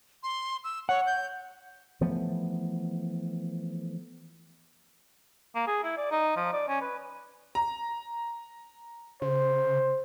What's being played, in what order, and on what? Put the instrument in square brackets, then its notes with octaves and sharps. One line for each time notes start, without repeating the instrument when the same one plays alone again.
[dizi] C6
E6
[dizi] C#5 [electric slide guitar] F#5
[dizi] G6
[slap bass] E3 F3 A3 B3
[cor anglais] A#3
G#4
E4
D5
D#4
F3
D5
C#4
B4
[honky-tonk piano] A#5
[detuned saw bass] C#3 [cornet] C5